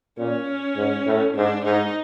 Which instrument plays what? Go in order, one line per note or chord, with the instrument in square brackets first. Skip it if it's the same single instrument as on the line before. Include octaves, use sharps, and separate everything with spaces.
[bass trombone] A#2 [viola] C#4
[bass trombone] G#2
A2
[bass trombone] G#2 [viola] D4
[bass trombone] G#2 [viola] D#4